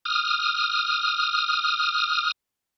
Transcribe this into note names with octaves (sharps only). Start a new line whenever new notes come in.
D#6 F6